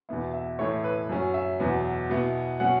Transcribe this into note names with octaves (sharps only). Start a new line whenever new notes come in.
E2 B2 B3 E4
E5
A2 E3 A3 E4 C#5
B4
F#2 F#3 C#4
E5
E2 B2 F#3 B3
B2 B3 E4
B2 F#3 C#4 F#5